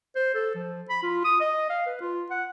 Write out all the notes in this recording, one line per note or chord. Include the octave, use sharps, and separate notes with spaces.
C5
A4
F3
B5
F4
D#6
D#5
F5
B4
F4
F#5